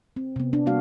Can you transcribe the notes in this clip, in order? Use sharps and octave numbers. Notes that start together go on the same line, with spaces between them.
C4
C3 B3
D4
C3 G3 A#3 F#4 F5